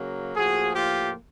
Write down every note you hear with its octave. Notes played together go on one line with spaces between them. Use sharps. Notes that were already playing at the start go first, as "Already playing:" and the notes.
Already playing: C#3 F#3 A#3
A2 F3 A#3 F#4 G#4
F4 G4